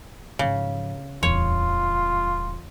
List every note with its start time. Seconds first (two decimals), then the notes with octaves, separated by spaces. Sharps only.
0.39 G#2 C#3 F3
1.23 D1 E2 G3 F4 C#5